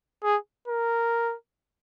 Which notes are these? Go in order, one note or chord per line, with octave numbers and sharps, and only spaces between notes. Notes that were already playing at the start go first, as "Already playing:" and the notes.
G#4
A#4